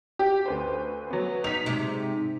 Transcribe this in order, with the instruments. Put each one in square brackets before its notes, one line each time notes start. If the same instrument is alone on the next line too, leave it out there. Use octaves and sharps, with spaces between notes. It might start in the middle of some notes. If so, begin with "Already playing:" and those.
[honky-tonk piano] G4
D2 B4 C5
F#3 B3
[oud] D#4 [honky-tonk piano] B6 F7
[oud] G#2 C3